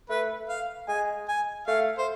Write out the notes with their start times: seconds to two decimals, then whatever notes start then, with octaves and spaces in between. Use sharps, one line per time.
0.10 A3 B4
0.49 F5
0.88 G#3 G#5
1.28 G#5
1.67 A3 F5
1.98 C5